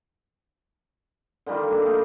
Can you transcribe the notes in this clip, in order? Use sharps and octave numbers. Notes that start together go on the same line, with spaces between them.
D3 D#3 G3 F4
G3 A#3 D4
A3 D#4